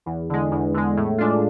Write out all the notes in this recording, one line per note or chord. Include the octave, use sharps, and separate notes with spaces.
E2
D3 G#3
E2
D3 G#3
A2
G#3 D4 F4